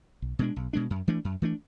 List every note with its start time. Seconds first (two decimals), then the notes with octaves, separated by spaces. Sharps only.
0.22 B1
0.39 B2 G#3 D4
0.56 B1
0.73 B2 G#3 D4
0.90 F#2
1.08 E3 A3 D4
1.25 F#2
1.42 E3 A3 D4